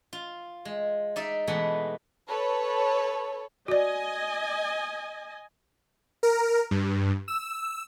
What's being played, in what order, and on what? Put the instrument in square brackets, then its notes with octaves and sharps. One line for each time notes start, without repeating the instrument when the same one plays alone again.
[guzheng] F4
G#3
D#4 D5 E5
B2 E3 G#3 A3 B3
[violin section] A4 B4 C#5
[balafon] F#4 D5 [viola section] D#5 G#5
[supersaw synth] A#4
G2
E6